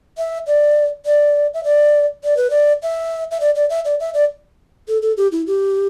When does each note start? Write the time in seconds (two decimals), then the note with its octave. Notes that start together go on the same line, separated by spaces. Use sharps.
0.18 E5
0.47 D5
1.06 D5
1.54 E5
1.64 D5
2.24 D5
2.37 B4
2.50 D5
2.83 E5
3.31 E5
3.40 D5
3.55 D5
3.70 E5
3.85 D5
4.00 E5
4.14 D5
4.88 A4
5.02 A4
5.17 G4
5.32 E4
5.47 G4